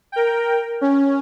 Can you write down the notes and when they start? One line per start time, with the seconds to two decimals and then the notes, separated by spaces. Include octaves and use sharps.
0.12 A#4 G5
0.81 C#4